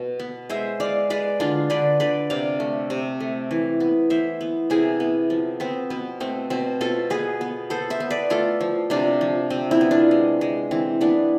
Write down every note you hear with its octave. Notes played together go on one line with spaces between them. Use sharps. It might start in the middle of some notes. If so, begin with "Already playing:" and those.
Already playing: B2
B3
G#3 C5 E5
G#3 D5 F5
G#3 B4 D5
D3 D4 F4
D3 B4 D5
D3 B4 D5
C3 D5 F5
A3
C3
A3
E3
B3
E3 C5 E5
B3
C3 E4 G#4
B3
F3
B3 C4
B2 B3
A3 C4
B2 C4
B2 F4 A4
B3 G#4 B4
B3
B3 A4 C5
C5 E5
B3
B4 D5
A3 F4 A4
F3
C3 D4 F4
F3
C3 C4
C4 E4
B3
D4 F4
G#3
G#3
E3 C4
E3 B3 D4